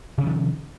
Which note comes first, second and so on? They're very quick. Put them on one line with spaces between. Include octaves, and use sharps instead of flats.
C3 C#4 F3 D#3